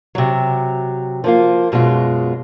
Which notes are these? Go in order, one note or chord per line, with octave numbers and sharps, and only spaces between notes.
C3 F#3
F3 A#3 F4
F#2 B2 G#3 F4